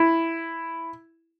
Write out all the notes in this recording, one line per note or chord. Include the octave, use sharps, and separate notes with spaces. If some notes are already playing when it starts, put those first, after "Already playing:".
Already playing: E4